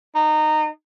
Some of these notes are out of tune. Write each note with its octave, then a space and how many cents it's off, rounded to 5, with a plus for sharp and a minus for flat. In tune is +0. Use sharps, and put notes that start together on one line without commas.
D#4 -20